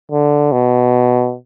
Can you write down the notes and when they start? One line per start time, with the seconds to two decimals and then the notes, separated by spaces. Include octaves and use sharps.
0.12 D3
0.52 B2